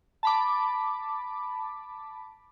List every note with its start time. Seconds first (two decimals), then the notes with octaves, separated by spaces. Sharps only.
0.23 A5 B5 D6